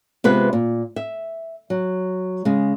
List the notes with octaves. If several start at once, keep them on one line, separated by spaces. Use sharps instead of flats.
C3 G#3 B3 F4 B4
A#2
E5
F#3
C#3 G#3